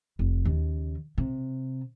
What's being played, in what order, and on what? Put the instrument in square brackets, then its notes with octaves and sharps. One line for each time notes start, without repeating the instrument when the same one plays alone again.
[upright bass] F1
D#2 C#3
C3